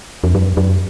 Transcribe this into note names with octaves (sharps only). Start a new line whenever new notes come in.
F2
F#2
F#2